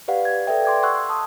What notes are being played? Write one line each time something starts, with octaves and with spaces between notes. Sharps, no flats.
G4 B4 D5 F5 F#5
G#6
A4 B4 D5 E5 G5
C6 D6 G#6
F#5 C6 C#6 E6 F#6
A5 D#6